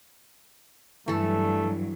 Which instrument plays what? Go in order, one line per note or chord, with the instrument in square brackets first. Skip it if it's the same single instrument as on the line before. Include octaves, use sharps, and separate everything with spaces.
[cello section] G2 F#3 [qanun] E3 A4 [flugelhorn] A3